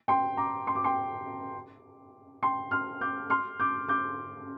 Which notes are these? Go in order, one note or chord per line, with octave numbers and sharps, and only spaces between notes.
G5 C6
A#5 D6
C6
D6
G5 C6
G5 C6
C6 F6
D6 G6
C6 F6
D6 G6
D6 G6